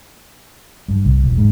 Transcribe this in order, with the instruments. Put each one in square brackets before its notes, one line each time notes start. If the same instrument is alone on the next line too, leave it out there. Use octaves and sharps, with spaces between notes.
[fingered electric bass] G2
C2
E1
G#2